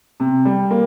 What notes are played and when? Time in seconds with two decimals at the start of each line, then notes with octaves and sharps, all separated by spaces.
0.20 C3
0.45 G3
0.71 A#3